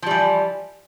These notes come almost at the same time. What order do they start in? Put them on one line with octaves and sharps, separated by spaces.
F3 G3 E3